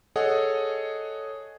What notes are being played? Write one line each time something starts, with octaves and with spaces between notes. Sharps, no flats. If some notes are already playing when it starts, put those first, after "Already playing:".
G#4 A4 C#5 D#5 F#5